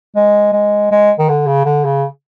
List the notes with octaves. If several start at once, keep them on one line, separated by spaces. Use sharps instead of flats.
G#3
G#3
G#3
D#3
D3
C#3
D3
C#3